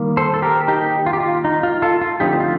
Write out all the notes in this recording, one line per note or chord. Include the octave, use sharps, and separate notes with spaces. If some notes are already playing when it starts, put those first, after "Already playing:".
Already playing: D#3 G3 A#3
A4 C5
A4
G4 A#4
D#4 G4
F4
G4
F4
D#4
F4
F4 A4
F4
D3 F3 A3 C4 D#4 G4
F4